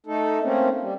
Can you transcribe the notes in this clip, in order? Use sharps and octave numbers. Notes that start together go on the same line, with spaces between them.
A3 D#4 A4
A3 A#3 C4 C#4
G3